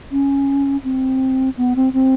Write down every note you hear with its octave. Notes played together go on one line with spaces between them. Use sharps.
C#4
C4
B3
C4
C4